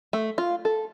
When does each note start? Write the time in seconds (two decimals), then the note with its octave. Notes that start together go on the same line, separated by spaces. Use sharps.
0.13 A3
0.38 F4
0.65 A4